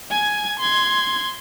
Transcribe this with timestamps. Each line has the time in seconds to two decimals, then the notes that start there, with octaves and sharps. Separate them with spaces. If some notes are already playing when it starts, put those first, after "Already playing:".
0.11 G#5 G#6
0.59 C6 G#6